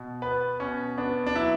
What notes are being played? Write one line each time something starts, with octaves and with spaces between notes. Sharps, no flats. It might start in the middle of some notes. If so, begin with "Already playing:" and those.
Already playing: B2
B3 B4
B2 C#4
B3 D4
D4
F#3 E4